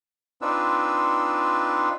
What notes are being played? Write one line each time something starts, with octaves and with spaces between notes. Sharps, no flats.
C4 D4 D#4 F4 B4 E6